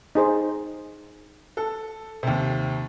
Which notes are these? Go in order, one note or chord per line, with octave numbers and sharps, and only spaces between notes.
D#4 G#4 C5
A4
D#2 C3